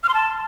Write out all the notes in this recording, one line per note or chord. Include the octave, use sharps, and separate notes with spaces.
F6
C6
A5